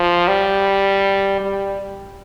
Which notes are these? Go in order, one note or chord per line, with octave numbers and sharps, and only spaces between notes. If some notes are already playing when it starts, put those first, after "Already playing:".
Already playing: F3
G3
G3